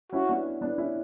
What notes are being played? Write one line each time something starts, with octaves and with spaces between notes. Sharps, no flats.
C#4 E4 F#4
B3 D4
B3 D4
C#4 E4